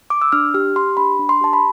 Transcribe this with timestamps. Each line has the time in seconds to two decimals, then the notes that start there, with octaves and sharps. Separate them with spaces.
0.10 D6
0.22 E6
0.32 D4 F6
0.54 G4 F6
0.76 G4 C6
0.97 D4 B5
1.19 D4
1.29 C6
1.41 G4 A5
1.53 B5